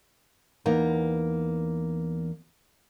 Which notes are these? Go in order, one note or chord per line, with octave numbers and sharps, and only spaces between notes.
E2 A#3 B3 D#4